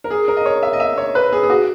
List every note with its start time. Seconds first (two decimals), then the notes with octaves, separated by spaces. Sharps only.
0.04 A#4
0.10 G#4
0.28 A#4
0.37 D#5
0.46 C#5
0.63 E5
0.73 D#5
0.80 E5
0.98 C#5
1.15 B4
1.33 G#4
1.43 G#4
1.50 F#4